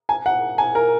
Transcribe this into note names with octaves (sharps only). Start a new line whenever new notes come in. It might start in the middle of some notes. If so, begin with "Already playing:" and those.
G#5
F#5
G#5
A#4